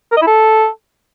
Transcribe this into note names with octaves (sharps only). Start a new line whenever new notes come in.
A#4
D#5
E4
A4